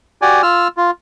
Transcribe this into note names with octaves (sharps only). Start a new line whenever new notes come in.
F#4 G4 D5 G#5
F4 E6 F6
F4